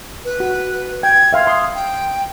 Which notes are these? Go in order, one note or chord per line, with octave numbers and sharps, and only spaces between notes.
B4
F#4
G5 G#6
E5 F5 C6
C6 D#6
G5